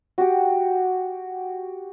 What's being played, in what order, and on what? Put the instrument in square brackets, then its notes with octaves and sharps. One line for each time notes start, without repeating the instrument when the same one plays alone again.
[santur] F#4 G4